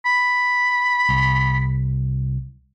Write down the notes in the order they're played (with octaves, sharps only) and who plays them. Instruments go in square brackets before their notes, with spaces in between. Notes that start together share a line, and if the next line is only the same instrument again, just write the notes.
[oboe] B5
[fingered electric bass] C2